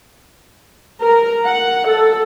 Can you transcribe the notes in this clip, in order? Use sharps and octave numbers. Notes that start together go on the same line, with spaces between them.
A#4
F#5
A4